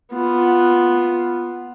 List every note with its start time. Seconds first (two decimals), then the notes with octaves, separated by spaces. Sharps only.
0.13 B3 F4